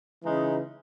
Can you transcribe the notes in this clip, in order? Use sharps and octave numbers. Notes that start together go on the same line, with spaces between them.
C#3 E3 G#3 D#4